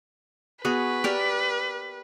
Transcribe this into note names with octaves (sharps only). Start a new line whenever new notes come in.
B3 F#4 G#4 B4
G4 A#4 D5